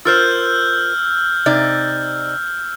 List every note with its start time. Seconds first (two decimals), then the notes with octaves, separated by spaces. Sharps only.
0.05 F4 A#4 C5 E6 F6 G6
1.46 C3 D#4 D5